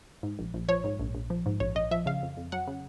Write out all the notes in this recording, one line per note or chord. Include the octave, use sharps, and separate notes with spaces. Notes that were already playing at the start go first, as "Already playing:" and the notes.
G#2
A#1
A#1
F3 C#5
G#2
A#1
A#1
F3
G#2
A#1 C#5
A#1 D#5
F3 E5
C#3 F5
F2
F2
F#3 F#5
C#3